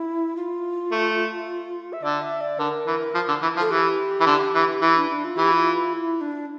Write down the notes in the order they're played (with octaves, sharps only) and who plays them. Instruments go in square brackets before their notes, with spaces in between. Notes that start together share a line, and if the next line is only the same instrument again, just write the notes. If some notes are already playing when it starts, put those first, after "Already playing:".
Already playing: [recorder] E4
F4
[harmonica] A3
[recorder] E5
[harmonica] D3 [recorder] D5
[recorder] E5
D5
[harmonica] D3 [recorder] A#4
[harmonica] E3
F3
D3
E3
F3
[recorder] A4
[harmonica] E3 [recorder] G4
[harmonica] E3
D3
E3
[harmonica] E3 [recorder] E4
[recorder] D4
D4
F4
[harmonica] E3 [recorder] G4
[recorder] F4
E4
D4